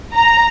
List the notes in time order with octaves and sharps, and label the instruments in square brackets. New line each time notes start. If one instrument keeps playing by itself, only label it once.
[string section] A#5